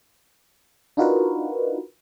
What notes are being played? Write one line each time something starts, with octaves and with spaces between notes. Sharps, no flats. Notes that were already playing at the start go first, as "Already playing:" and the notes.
D4 D#4 F4 F#4 A#4 B4